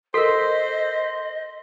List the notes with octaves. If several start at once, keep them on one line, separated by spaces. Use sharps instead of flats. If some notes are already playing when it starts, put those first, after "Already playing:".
A4 A#4 C5 D#5 C6 B6